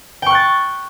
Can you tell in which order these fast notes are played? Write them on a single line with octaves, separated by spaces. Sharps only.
G5 C#6 F#6 A6